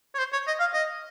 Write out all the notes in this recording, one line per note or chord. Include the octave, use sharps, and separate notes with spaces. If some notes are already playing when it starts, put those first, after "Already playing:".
C#5
C5
C#5
D#5
F5
D#5